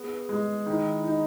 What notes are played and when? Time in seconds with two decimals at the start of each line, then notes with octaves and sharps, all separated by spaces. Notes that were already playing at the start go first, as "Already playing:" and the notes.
Already playing: B3 G#4
0.29 G#3
0.66 D#3 E4
1.04 D#4